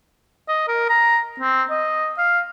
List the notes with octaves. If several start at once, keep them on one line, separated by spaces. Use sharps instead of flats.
D#5
A#4
A#5
C4
D#5
F5